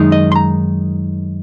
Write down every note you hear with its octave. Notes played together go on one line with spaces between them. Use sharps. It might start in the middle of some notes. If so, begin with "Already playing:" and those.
Already playing: F#2 D#3 G#3 D#4
D#5
C6
A#5